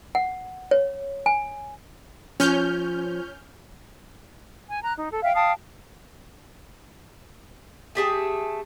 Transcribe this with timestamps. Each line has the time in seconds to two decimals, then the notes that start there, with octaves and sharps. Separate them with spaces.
0.15 F#5
0.71 C#5
1.26 G#5
2.40 F3 C#4 F6 G6
4.69 G#5
4.83 A#5 F#6
4.97 D#4
5.12 A4
5.24 E5 F5 G5
5.35 F5 G5 A5 D#6
7.95 A3 G4 G#4 A5